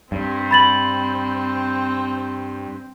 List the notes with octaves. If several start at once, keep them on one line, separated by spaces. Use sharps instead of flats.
G2 C4
B5 A6 F#7